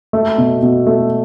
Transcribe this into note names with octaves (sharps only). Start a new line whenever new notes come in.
A3
B2
B2
A3